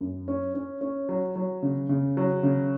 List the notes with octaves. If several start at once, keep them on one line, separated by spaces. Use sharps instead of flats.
F#2
C#4
C#4
C#4
F#3
F#3
C#3
C#3
F#3
C#3